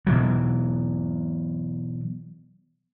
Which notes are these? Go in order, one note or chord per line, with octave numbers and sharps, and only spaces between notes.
B2 E3 F#3